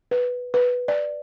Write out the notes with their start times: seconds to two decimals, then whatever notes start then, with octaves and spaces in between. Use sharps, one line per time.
0.11 B4
0.54 B4
0.88 D5